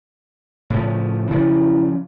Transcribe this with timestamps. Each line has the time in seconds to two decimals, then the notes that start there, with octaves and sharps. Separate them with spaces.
0.70 A2 C#3 F3
1.31 C#3 F3 F#3 E4